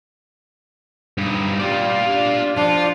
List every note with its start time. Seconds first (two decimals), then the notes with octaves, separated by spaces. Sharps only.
1.18 G2 D#4
1.59 G3 F4 D5
2.10 D4
2.57 F3 D4 F4